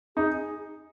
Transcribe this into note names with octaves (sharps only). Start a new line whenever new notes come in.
D#4 G#4